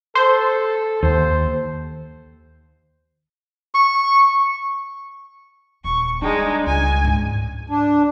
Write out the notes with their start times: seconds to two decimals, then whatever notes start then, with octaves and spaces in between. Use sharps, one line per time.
0.15 A4 C5
1.03 D#2 C5
3.75 C#6
5.84 D#1 C#6
6.22 G3 G#3 D4 D#4
6.67 C#2 G#5
7.05 G#2
7.70 D4